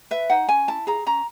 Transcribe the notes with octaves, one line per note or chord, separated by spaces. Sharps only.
B4 E5
D#4 F#5
C#4 G#5
E4 A5
G#4 A#5
C#4 A#5